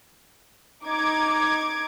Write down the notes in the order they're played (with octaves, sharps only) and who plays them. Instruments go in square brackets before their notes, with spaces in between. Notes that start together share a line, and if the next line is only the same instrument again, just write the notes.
[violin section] D#4 D6 G#6